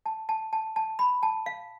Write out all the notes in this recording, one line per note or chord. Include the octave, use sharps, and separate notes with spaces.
A5
A5
A5
A5
B5
A5
F5